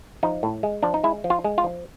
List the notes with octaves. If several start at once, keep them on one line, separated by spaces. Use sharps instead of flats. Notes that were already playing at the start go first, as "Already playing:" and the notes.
F3 D#4
A2
G#3
F3 D4
D#4
G#3 E4
F3
F4
G#3
F4
F3